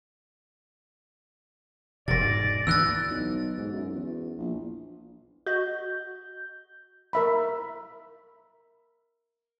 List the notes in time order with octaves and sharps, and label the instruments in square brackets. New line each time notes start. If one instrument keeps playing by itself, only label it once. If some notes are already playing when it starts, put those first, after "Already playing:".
[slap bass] E1 C3 [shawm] D5 [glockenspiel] A6 A#6
[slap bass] G#2
[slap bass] D2 E3 [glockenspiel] E6 F#6 A6
[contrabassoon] B1
G#2
F#2
E2
A#1
[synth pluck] F#4 D#5 [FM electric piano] G6
[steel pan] A#4 E5 B5